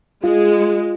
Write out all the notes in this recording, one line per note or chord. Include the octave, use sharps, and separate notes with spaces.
G#3 F4